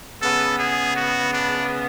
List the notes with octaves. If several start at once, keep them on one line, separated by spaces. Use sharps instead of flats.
C#3 G#3 B3 A4
G#4
F#4
D4